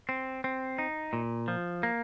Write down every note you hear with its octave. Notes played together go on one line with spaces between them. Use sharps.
C4
C4
D#4
A#2
F3
A#3